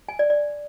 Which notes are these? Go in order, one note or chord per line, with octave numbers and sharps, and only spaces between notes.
G#5
D5
D5